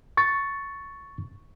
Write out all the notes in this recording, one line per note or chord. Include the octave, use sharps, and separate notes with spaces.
C#6 A6